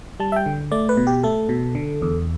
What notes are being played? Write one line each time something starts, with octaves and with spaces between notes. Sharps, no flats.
G3 A5
E5
G5
D3
A3 D5
B4
B2
G4
A3 A4
B2
D3
E2